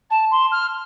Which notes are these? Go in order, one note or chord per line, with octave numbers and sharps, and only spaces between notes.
A5
C6
F6